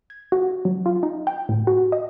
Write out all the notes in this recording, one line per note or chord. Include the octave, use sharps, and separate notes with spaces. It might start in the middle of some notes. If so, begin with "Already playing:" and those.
G#6
F#4
F#3
F4
D#4
G5
A2
F#4
D#5